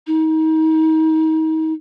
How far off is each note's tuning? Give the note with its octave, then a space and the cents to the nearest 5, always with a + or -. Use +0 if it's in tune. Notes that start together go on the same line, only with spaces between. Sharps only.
D#4 +30